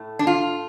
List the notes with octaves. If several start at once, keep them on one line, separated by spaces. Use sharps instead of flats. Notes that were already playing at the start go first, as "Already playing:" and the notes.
Already playing: A2 A3
D4
F4